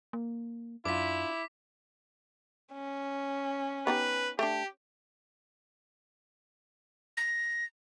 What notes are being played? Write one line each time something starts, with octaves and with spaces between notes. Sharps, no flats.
A#3
F#2 D4 E4 F4 D6 B6
C#4
B3 D#4 G4 B4
A3 D4 G4
A#6